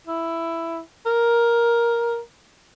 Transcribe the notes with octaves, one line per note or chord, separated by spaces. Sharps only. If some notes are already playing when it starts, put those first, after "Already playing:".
E4
A#4